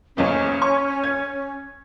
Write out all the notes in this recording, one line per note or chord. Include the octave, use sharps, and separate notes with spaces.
F#1 B1 E2 C#4
C#6
G#6